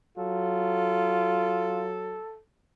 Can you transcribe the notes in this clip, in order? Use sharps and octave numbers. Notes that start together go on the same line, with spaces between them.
F#3 F4 A4